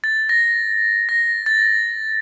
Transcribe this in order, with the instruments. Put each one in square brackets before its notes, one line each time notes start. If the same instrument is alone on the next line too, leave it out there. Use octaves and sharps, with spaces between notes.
[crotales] A6
A#6
A#6
A6